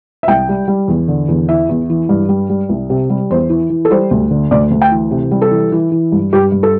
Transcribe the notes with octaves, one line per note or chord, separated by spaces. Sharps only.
E5
C2 G5
G3
G3
E2
D3
E2
E3 E5
E2
E3
G2
G3
G3
C2
C3
G3
E2 C5
E3
E3
A4
G3 C5
D2
D3
D2 D5
D2
G5
E3
C3
G3
A4
E3
E3
E3
G2
G2 G4
G2
A4